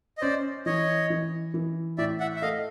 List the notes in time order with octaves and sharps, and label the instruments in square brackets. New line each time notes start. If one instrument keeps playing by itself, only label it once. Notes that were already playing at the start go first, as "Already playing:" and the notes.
[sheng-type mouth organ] D#5
[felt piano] C#4 [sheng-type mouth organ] C5 D5
[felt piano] E3 [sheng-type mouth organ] C#5 D#5
[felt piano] E3
E3
[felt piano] A2 [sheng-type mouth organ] D5 E5
[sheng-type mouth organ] E5 F#5
E5
[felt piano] A3 [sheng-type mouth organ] D#5 F5